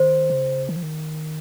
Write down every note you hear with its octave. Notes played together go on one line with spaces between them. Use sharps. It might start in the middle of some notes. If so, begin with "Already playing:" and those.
Already playing: D#3 C5
C#3
D#3
F3
D#3